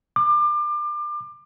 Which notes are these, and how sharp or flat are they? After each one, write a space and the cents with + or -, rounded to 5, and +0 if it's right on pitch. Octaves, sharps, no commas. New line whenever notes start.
D6 +30